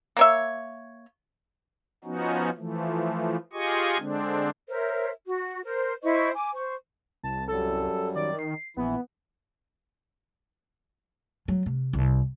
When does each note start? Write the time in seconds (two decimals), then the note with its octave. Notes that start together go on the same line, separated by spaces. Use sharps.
0.17 A#3 C#5 E5
2.04 F3 B3 C#4 D#4 F#4
2.57 E3 F3 A3
3.53 F4 G4 G#4 D#5 G#5 C#6
3.98 D3 G#3 C4 D4
4.68 A#4 C5 C#5 E5
5.26 F#4
5.65 A#4 C5
6.03 E4 C5 D#5 C#6
6.34 G#5 D6
6.54 C5 C#6
7.23 C2 A5
7.48 F#2 F#3 G3 A4
8.15 D#3 D5
8.39 C7
8.77 A#1 E3 B3 E4
11.48 F#3
11.66 C3
11.93 C2